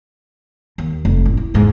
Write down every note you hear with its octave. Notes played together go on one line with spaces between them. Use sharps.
D#2
F1
A1
E4
E2 G#2